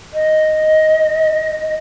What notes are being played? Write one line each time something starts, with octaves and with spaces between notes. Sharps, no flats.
D#5